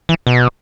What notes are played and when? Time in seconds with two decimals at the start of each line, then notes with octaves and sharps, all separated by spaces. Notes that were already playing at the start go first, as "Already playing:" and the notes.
0.09 E3
0.27 B2